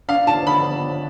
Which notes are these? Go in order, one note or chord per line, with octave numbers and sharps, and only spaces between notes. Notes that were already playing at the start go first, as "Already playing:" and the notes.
D4 F5
D3 A5
D3 B5